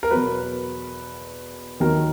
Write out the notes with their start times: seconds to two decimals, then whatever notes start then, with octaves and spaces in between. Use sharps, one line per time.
0.03 A#4
0.11 E2 B2 F#3 B4
1.80 D#2 D#3 F#3 A#4